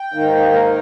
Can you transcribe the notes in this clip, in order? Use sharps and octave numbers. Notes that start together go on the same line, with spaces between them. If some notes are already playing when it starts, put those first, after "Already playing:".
Already playing: G5
G#2 D#3 A#3 D#4
A#4